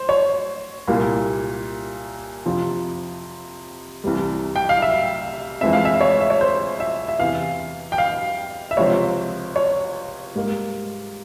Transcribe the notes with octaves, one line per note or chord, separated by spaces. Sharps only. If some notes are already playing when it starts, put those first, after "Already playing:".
Already playing: C5
C#5
C2 A#2 G3 A#3
F2 C3 F3
C2 C3 E3 G3
G5
F5
E5
F2 E3 G#3 C4 E5
F5
E5
C#5
E5
C#5
C5
E5
E5
E2 C3 E3 F5
G5
F5
E5
C#2 C3 F3 C4 C#5
C#5
G#2 G3 A#3